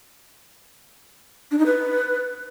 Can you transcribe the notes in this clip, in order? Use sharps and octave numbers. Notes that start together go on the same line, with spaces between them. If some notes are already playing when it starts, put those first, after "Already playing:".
D4
D#4
B4